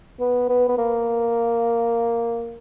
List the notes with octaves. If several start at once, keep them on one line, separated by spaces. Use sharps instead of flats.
B3
B3
B3
A#3